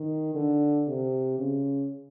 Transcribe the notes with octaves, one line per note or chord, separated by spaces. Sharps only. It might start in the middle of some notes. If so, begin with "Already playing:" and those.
Already playing: D#3
D3
C3
C#3